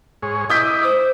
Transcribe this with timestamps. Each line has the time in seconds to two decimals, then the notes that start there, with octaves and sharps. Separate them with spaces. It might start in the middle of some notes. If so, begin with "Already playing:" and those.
0.23 G#2 G#4 C#5
0.50 E4 D#5 D6 D#6 G6 B6
0.84 C5